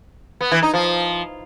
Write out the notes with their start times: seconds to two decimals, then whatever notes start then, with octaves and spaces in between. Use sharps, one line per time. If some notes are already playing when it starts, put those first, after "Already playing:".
0.41 B3
0.52 E3
0.63 D#4
0.74 F3